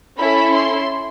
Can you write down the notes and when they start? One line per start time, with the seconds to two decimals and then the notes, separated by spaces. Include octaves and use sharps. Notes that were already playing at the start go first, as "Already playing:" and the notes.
0.18 C#4 E4 A4 B5
0.53 C6